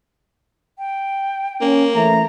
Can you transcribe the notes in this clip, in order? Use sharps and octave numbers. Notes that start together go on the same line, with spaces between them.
G5
A#3 C#4
E3 A3 A#5